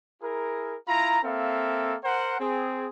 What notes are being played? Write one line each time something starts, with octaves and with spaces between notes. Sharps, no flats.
E4 G#4 A#4
E4 F4 A#5
A#3 C4 A4 E5 F5
A#4 C5 F#5
C4 G#4